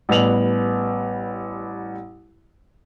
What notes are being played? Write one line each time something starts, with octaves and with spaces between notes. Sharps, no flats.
A1 G3 B3 F7 F#7